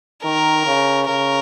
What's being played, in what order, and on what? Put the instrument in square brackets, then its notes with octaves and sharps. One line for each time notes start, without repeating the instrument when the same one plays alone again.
[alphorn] D#3 [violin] A#4
[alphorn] C#3
[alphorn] C#3 [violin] A#4